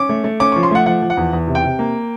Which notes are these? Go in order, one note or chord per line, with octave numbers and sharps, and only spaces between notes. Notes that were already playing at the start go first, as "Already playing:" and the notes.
Already playing: C#4 D6
A3
A3
C#4 D6
F3 C#6
C6
A3 F#5
F3 F#5
F3
F#5
E2
E2
C3
G5
C3
A#3